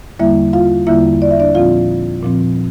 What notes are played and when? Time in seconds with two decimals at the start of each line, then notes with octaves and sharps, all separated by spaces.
0.19 E2 D3 G3 A#3 E4 E5
0.53 F4 F5
0.87 E2 D3 G3 A#3 E4 E5
1.22 D5
1.31 E5
1.40 D4 D5
1.55 A#2 F3 C4 F4 F5
2.23 A#2 F3 C4